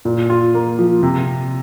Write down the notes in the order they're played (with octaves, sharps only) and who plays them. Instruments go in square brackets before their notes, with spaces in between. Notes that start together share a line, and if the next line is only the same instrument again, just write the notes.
[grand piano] A#2
F4
A#3
F3
C3